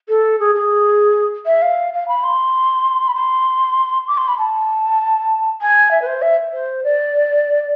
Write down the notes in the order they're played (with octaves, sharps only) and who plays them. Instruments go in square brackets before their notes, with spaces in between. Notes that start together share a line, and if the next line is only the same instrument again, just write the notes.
[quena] A4
G#4
G#4
E5
F5
F5
B5
C6
B5
C6
D6
C6
B5
A5
G#5
E5
B4
C5
E5
C5
D5